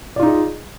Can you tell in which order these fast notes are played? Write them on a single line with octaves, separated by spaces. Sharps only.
D5 F4 D#4 G#4